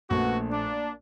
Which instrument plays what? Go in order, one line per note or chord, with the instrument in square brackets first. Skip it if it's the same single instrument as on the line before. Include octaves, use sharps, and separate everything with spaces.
[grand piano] A#1 A3 [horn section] B3 F#4
[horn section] A#3 D4